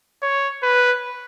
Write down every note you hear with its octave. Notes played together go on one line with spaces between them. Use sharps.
C#5
B4